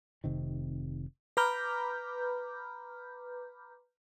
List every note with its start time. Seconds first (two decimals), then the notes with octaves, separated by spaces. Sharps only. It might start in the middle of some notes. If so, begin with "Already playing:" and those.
0.24 F1 C3 D#3
1.37 B4 A#5 B5 D6 F6 G6